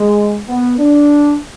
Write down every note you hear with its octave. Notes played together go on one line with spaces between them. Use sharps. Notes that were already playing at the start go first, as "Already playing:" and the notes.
Already playing: G#3
B3
D4